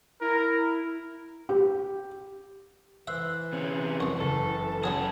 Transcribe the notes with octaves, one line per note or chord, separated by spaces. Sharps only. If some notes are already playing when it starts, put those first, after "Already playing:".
E4 A#4
G4
E3 C5 E5 F#6
C3 C#4
C2 F2 C#6
F#1 A4
F#2 C#3 F#3 G#4 A5